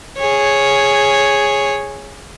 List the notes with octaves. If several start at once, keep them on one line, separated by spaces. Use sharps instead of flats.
G#4 C#5